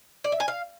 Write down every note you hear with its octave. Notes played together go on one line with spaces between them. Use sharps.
D5
E5
G#5
F5